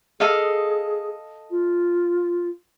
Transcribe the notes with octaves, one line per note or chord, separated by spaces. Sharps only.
G#4 A4 D#5 F5
F4